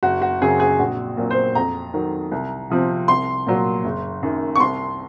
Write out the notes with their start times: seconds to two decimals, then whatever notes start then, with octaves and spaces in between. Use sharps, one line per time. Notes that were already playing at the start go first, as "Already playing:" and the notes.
0.03 F#1 F#4
0.22 F#4
0.41 F#2 C#3 F#3 C4 G#4
0.60 G#4
0.79 A#1 F#4
1.17 A#2 F#3
1.30 C5
1.55 F2 A#5
1.94 D#3 F#3
2.32 C2
2.70 C3 F3 C4
3.08 C2 C6
3.46 A#2 F#3
3.84 F#1
4.23 F#2 D#3
4.55 C#6
4.60 C2 C6